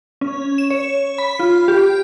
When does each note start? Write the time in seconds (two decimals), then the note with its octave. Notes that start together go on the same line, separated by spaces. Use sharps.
0.21 C#4
0.58 E7
0.70 C#5
1.18 B5
1.39 F4
1.68 G4